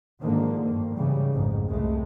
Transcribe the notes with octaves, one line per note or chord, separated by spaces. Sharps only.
G#2 D3 D#3 F3 A#3
G2 A#3
G#2 C#3 E3 G3
A1 F2 G#2
C2 G#3 A3